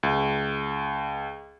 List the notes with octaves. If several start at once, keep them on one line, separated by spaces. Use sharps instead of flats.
C#2